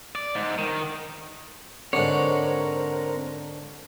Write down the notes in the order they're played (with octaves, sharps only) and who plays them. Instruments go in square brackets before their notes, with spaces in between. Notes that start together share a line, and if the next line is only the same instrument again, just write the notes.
[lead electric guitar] D5
G#2
D#3
[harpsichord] G#2 D3 [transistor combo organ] C4 A#4 [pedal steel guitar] C#5 F#5